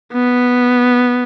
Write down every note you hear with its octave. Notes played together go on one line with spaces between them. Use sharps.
B3